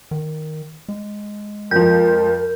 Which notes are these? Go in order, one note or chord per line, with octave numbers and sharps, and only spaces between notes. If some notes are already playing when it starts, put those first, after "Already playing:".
D#3
G#3
F2 F3 A#4 G6